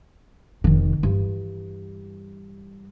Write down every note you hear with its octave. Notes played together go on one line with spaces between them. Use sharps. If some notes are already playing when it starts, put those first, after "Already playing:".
F1 D#3
G2 E3